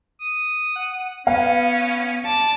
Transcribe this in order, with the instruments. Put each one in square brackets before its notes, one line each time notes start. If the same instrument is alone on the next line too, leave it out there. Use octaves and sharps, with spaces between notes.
[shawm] D#6
[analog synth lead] F#5
[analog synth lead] B3 [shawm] C#4 [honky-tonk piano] F5
[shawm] D5 [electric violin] A5